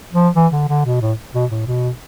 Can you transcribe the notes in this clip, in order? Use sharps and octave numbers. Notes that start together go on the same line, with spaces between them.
F3
E3
D3
D3
B2
A2
B2
A2
B2